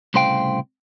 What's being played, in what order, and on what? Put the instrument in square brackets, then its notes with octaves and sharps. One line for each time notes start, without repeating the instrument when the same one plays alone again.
[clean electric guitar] C2 A2 C#3 C5 F5 G5